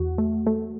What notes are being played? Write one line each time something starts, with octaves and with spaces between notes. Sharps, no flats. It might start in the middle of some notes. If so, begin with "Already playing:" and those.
Already playing: E2 F#4
A3
A3